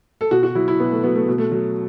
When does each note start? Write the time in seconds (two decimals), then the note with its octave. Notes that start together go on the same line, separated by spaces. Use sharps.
0.21 A4
0.31 B2 F#4
0.43 F#4
0.55 F#3 E4
0.68 E4
0.80 B2 B3
0.92 A3
1.03 F#3 B3
1.16 A3
1.28 B2
1.38 A3
1.52 F#3